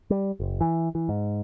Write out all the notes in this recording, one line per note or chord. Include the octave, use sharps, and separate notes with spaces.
G3
F#1
E3
E3
G#2